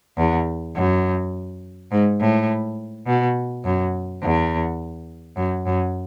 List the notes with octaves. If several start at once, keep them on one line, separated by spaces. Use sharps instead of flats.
E2
F#2
G#2
A2
B2
F#2
E2
F#2
F#2